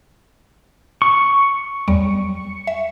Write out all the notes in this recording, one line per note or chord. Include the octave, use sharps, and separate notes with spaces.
C#6
E2 F#3 G3
E5